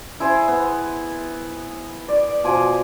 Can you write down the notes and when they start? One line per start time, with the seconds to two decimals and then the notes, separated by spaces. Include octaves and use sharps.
0.20 E4 G#4 C5 E5
0.48 B3
2.09 D5
2.44 B2 F3 G#5 D6